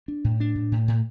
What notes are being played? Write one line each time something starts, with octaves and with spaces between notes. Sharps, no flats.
D4
A2
D4
A2
A2
A2